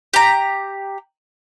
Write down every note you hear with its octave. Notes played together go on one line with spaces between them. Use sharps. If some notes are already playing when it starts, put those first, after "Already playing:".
G4 A#5